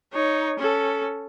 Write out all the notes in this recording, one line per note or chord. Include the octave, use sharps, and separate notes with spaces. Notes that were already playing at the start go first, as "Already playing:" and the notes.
D#4 C#5
C#4 A4